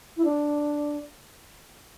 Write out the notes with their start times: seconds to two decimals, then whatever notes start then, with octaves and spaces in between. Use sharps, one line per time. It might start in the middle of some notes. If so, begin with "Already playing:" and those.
0.17 E4
0.24 D4